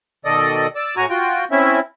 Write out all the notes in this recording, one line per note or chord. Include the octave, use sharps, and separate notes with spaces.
B2 D#3 A4 D5 D#5 D#6
D5 D6 E6
A2 F#4 G#5 A#5 C#6
F4 F#4 G5
C4 C#4 E4 E5